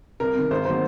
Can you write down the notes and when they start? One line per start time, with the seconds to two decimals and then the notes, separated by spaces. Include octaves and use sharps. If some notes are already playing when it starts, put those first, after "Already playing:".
0.20 C2 A#4
0.35 C3 D#3
0.51 G#1 C5
0.65 D#3 F#3 A#3 C5